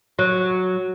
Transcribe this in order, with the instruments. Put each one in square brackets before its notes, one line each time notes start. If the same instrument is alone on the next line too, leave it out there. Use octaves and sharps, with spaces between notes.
[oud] F#3